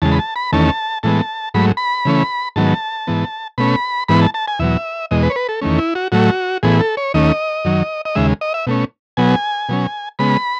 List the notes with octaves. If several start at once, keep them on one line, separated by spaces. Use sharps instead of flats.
E2 C#3 G#3 A5
B5
A5
B5
E2 D#3 A3 C#4 A5
A2 E3 G#3 B3 A5
G#2 F#3 A3 B5
B5
C#3 E3 A3 C#4
G#2 D#3 F#3 B3 A5
G#2 E3 B3
B2 A3 C#4 B5
G#2 E3 B3 B5
A5
A5
G#5
E2 B2 F#3 E5
E2 B2 G#3 D#5
B4
C#5
B4
A4
E2 D#3 A3 C#4
E4
F#4
A2 F#3 A3 F#4
A2 E3 B3 G#4
A4
C#5
D#2 D#3 A3 C#4 D#5
F#2 D#3 F#3
D#5
D#2 C#3 G#3 E5
D#5
E5
B2 A3 C#4
B2 F#3 B3 G#5
B2 F#3 C#4
C#3 G#3 B3 B5